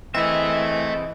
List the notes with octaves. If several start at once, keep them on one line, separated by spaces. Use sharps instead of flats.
E3 C4 E4 G#4 A4 D#5 E5